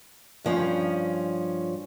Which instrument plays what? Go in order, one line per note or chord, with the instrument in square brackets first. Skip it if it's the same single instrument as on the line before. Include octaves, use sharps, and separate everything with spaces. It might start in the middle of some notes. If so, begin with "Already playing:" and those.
[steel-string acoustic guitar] G2 F3 C#4